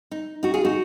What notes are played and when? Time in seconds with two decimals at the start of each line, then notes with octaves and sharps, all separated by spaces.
0.11 D#4
0.43 D#4 F#4
0.54 F4 G#4
0.65 D#4 F#4